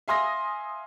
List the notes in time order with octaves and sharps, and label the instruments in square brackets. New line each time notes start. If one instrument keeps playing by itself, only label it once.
[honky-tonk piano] E5 F5 G#5 C6 D#6 A#6